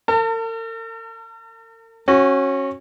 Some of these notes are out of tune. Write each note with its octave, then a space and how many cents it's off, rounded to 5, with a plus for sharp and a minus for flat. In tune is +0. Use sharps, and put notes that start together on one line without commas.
A#4 -45 A5 +40
C#4 -25 F#4 +0